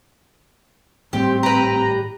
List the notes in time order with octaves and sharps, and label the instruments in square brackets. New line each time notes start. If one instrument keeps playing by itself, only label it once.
[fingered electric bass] G#1 A2 G3 [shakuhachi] C4 [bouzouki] G4
[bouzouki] G4 B4 [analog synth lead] A#5